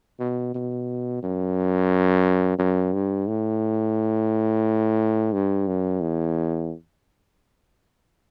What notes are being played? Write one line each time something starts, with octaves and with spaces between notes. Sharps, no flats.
B2
B2
F#2
F#2
G2
A2
G2
F#2
E2